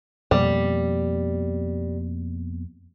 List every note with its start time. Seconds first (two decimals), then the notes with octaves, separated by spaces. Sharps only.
0.31 F2 B2 G3 A#3